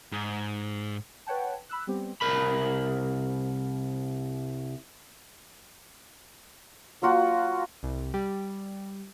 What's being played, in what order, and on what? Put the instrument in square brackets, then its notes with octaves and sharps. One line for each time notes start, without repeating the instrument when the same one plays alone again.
[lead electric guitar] G#2
[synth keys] B4 C#5 F#5 G5 A5
B5 E6 F#6
G3 B3 C4 G4
[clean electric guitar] C2 A#4 B5
[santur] F#3 A#3 F4 F#4
[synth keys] C2
G3